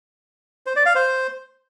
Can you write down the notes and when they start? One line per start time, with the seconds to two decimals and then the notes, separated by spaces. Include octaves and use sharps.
0.66 C5
0.76 D5
0.86 F5
0.95 C5